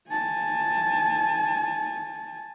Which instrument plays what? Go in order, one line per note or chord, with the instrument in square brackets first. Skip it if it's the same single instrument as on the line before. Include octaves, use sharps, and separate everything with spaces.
[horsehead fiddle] G#5 A5